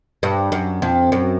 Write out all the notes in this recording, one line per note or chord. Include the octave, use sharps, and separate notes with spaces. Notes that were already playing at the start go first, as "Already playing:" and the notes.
G2
F#2
F2
F#2